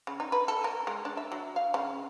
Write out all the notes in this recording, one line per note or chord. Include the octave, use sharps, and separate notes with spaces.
C#3
D#4
B4
A4
A#4
G#3
D4
E5
F#3
F5
C#3